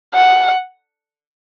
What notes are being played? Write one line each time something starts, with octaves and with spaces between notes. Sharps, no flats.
F#5